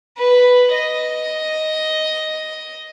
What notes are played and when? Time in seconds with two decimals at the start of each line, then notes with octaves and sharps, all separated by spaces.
0.17 B4
0.73 D#5